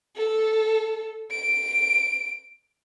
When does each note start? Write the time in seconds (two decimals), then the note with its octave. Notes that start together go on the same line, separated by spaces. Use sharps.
0.16 A4
1.31 D7